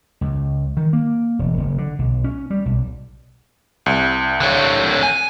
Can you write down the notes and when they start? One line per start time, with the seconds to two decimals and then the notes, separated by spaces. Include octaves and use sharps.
0.21 C#2
0.77 D#3
0.93 A#3
1.39 E1
1.57 F#1
1.78 D3
1.99 B1
2.24 C#4
2.50 G3
2.66 B1
3.86 C2
4.40 D3 C#5
5.03 G#5